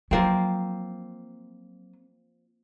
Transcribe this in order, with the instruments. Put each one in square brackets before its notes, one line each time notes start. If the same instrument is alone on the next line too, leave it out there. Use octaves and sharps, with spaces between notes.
[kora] F3 A#3 C4 [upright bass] F#3